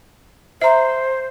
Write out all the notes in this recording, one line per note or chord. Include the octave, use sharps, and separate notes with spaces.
C5 E5 A#5